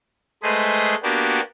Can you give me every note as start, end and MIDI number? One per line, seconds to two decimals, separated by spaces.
0.43 0.95 56
0.43 0.95 57
0.43 0.95 68
0.43 0.95 71
0.43 0.95 72
0.43 0.95 75
1.03 1.41 58
1.03 1.41 59
1.03 1.41 62
1.03 1.41 66
1.03 1.41 67